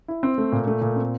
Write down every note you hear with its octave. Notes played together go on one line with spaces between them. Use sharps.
E4
C4
A3
A#2
A3
A#2
C4